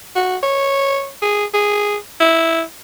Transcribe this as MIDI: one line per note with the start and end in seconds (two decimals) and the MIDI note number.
0.15 0.37 66
0.43 1.09 73
1.22 1.45 68
1.54 1.96 68
2.20 2.62 64